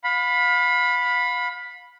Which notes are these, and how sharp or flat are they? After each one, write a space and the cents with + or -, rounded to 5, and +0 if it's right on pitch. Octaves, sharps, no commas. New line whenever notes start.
F5 +35 B5 +0